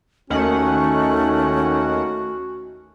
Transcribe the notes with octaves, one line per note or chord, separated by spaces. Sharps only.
D#2 D#3 A3 C#4 F#4 F#5